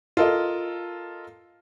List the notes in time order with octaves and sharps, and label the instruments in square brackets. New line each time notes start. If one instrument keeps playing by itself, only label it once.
[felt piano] F4 A4 A#4 D#5